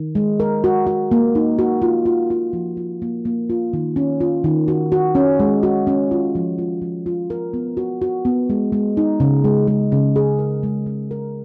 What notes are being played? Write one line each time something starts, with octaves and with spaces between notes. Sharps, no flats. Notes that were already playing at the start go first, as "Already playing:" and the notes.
Already playing: D#3
G#3
A#4
F#4
F#4
A#3
D#4
F#4
F4
F4
F4
F3
F4
A#3
A#3
F4
D#3
C#4
F4
D#3
F#4
F#4
C#4
G#3
F#4
C#4
F4
F3
F4
F3
F4
A#4
B3
F#4
F#4
B3
G#3
G#3
D#4
C#3
G#3
G#3
C#3
G#4
A#4
G#3
G#3
A#4